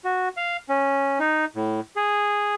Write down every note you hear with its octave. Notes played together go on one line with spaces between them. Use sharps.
F#4
F5
C#4
D#4
A2
G#4